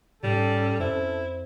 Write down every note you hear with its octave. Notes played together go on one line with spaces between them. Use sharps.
G#2 G3 C#4 A4
F2 E4 C5